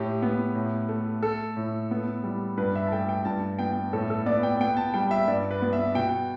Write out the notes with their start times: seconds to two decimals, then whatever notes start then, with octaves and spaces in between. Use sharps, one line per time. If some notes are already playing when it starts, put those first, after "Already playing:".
Already playing: A2 G4
0.22 B3
0.55 A2
0.89 A3
1.23 A3 A4
1.57 A2
1.91 B3
2.24 G3
2.57 G2 B4
2.75 E5
2.87 A5
2.92 A3 G5
3.09 G5
3.25 G2 A5
3.59 B3 G5
3.93 A2 A4
4.10 A4
4.26 B3 D5
4.43 G5
4.60 B3 G5
4.77 A5
4.94 G3 G5
5.11 E5
5.27 G2 D5
5.51 B4
5.62 B3
5.73 E5
5.95 B2 G5